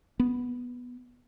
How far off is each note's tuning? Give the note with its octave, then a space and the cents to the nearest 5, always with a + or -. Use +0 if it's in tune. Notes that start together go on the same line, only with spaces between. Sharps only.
B3 -5